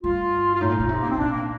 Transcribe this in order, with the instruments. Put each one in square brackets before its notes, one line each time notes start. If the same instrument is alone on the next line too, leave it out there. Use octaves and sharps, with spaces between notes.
[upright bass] G2 [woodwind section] F4
[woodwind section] F4
[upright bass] A2 [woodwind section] D#4
[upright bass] A#2
A#2
C3
[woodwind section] A#3
C4
[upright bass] A#2 [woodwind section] D4
[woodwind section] A#3